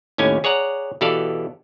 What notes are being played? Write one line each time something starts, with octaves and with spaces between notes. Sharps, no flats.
D#2 A2 C#4 G4 G#5
G#4 C#5 D5 F#5 A#5
B2 E3 G4 A4 D5 F5